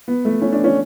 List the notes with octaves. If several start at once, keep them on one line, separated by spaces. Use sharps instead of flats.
B3
A3
C#4
D4
C#4